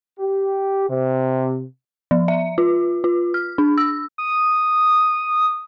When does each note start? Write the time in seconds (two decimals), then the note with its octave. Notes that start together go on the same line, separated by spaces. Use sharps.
0.19 G4
0.89 C3
2.11 F3
2.28 E5
2.58 F4
3.04 F4
3.34 F6
3.58 D4
3.78 E6
4.18 D#6